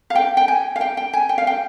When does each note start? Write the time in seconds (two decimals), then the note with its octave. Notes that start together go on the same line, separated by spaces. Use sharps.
0.10 F5
0.15 G5
0.37 G5
0.48 G#5
0.76 F5
0.81 G5
0.97 G5
1.13 G#5
1.29 G5
1.38 F5
1.47 G5